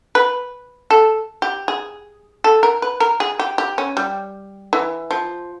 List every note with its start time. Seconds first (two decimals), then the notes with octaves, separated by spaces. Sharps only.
0.15 B4
0.91 A4
1.42 G4
1.68 G#4
2.44 A4
2.63 A#4
2.82 B4
3.00 A#4
3.20 G#4
3.40 G4
3.58 G4
3.78 C#4
3.97 G3
4.73 E3
5.11 F3